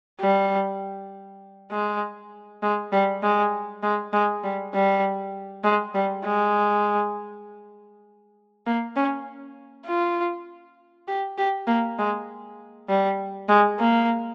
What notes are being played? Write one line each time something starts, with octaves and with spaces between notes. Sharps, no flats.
G3
G#3
G#3
G3
G#3
G#3
G#3
G3
G3
G#3
G3
G#3
A#3
C#4
F4
G4
G4
A#3
G#3
G3
G#3
A#3